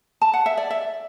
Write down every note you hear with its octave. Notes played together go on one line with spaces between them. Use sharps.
A5
F#5
E5
D5
E5